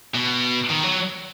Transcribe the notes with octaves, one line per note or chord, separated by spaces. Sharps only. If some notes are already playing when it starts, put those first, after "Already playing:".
B2
D#3
F#3